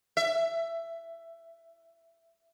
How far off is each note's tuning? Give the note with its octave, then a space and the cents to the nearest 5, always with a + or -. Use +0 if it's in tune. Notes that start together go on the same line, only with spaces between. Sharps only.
E5 +15